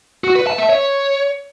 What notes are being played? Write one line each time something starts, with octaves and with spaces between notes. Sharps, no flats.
F#4
B4
A5
E5
C#5